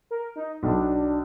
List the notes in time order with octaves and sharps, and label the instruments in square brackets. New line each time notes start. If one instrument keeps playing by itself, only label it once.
[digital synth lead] A#4
D#4
[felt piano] B1 [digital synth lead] D4